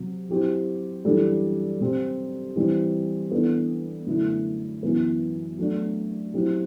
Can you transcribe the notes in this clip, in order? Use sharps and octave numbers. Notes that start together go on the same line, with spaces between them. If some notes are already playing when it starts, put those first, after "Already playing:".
Already playing: C3 F#3
F#3 C4 E4 G4
F#2 E3 G3 D4 A4
C3 G3 C4 G4
E3 G3 C4
E3 B3 D4 A4
F#2 D3 A3 E4
F#2 E3 B3
F#3 A3 D4
F#3 C4 E4 G4